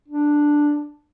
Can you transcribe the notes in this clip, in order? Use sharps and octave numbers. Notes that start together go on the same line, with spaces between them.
D4